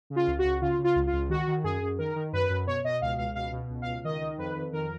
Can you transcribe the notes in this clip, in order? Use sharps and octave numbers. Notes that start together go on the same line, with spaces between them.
C#3
F4
C#2
F#4
C#2
C#3 F4
C#3
F4
C#2
F4
C#2
D#3 F#4
D#3
F#2 G#4
F#2
D#3 A#4
D#3
F#2 B4
F#2
B2 C#5
B2 D#5
C#2 F5
C#2 F5
B2 F5
B2
C#2
C#2 F5
D#3 D#5
D#3
F2 B4
F2
D#3 A#4